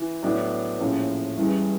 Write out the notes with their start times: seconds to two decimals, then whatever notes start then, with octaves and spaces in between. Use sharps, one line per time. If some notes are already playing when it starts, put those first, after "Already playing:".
Already playing: E3
0.23 A2 F#3 B3 D4
0.79 A#1 A2 F3 A#3 C#4
1.36 A1 G2 E3 G#3